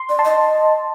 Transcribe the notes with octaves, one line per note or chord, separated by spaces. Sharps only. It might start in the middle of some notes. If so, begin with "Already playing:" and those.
Already playing: C6
D5
A5 C6
D#5
D#5